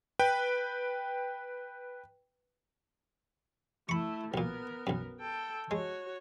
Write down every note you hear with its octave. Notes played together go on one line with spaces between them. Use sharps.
B4 G5
A3 E4 B5 C#6
B1 A#2 B3 A#4
B1 F#2
A4 G5
G#3 F#4 C#5